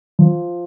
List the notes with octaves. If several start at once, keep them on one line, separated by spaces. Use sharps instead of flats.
F3